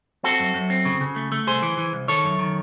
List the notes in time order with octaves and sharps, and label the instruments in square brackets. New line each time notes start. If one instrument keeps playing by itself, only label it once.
[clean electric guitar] C4 F#4 A4
F#2
F#2
C4
C#3
C#3
A3
A3
C2 G#4 C5
E3
E3
C2
D#3 A4 C#5
F#2
D#3